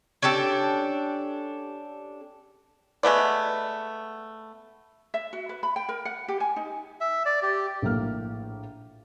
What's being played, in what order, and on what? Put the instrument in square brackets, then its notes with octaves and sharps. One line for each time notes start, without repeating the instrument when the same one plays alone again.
[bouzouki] C#4 D4 G4 A4
[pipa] G#3 A3 B3 D5
[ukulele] E5
F#4
B4
B5
G5
A#4
F#5
G4
G#5
D#4
[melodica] E5
D5
G4
[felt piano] A#1 A2 A#3 F6